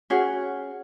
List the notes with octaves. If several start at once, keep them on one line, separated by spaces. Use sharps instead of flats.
C#4 F#4 G#4 C#5